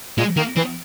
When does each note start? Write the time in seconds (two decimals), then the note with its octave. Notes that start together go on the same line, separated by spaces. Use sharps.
0.17 A#2 G#3
0.36 D#3 A#3
0.56 E3 C4